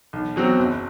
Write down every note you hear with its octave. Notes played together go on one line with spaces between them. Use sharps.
B1
B2 F#3 C4 F#4
F#1